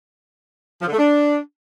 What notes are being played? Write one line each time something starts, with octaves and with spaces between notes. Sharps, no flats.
F3
D3
A3
D4